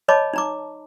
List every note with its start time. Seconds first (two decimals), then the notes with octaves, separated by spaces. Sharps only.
0.08 C#5 D#5 A5 B5 D6
0.33 D#4 A#5 D6